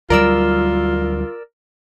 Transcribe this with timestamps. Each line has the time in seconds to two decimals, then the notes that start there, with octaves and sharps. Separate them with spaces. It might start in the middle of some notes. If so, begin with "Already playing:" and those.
0.10 D2 F#3 G3 F4 A#4 D5 E6